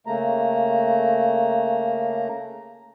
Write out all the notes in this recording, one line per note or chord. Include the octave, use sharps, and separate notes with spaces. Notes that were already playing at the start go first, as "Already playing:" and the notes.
C#3 A3 A#3 A#5